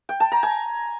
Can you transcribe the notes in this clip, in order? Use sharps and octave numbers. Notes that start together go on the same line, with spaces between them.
G5
A5
A#5
G#5